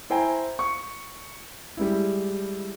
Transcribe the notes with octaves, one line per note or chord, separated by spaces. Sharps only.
E4 C5 G5 G#5 A#5
C#6
G3 G#3 E4